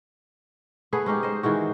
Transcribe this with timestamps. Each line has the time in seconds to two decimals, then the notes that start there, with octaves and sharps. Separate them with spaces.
0.92 A3 B3 G#4 B4
1.06 G#3 C#4 D#4 G4
1.23 C5 D#5
1.43 D#3 E3 G#3 F#4